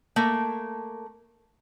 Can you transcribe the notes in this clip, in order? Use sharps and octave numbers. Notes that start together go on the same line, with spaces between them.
A3 A#3